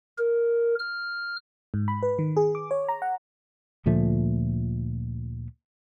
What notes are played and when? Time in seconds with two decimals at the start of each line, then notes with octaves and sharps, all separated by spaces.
0.18 A#4
0.79 F6
1.74 G#2
1.88 B5
2.03 B4
2.19 D#3
2.37 G#4
2.55 D6
2.71 C#5
2.89 A#5
3.02 F#5
3.86 D2 A#2 F3 A3